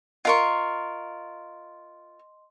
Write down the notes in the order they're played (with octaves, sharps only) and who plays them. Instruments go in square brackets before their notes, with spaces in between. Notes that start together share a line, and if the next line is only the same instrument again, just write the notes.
[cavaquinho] F4 A#4 C#6 [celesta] D#5 C6